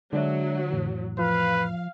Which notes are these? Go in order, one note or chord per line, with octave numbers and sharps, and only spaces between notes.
D3 F#3 G#3 D4 E5
F2 A2 E3
F3 B4 F5